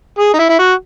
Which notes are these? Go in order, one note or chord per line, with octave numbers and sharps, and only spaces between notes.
G#4
D#4
E4
E4
F#4